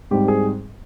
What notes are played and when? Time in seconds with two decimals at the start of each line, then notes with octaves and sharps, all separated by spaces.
0.11 G#2 G3 C4 G4
0.28 G#4